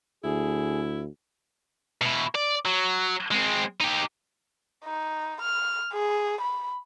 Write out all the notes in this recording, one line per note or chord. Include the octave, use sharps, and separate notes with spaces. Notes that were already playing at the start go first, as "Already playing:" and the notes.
D2 E4 G#4
B2 E4
D5
F#3
G#3 C4
D#4 G4
D#4
F6
G#4
B5